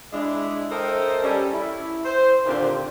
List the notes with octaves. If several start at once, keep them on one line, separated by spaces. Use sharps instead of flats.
G#3 D4 E4
A4 A#4 C5 D#5 E5 G5
G3 C#4 A4
E4
C5
A#2 D3 D#3 C4 F4 G4